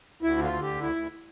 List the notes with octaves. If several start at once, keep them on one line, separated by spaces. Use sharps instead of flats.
D2 E4
D3
F4
D3
G4
D2
D2 E4
D2